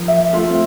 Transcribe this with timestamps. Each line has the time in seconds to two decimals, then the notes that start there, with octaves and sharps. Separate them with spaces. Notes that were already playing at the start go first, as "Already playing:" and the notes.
Already playing: F3 A#4
0.08 E5
0.33 A3 F4
0.49 C4